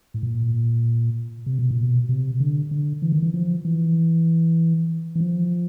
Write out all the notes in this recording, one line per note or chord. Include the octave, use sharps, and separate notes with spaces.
A2
A#2
C3
B2
A#2
B2
C3
D3
D3
E3
D#3
E3
F3
E3
E3
F3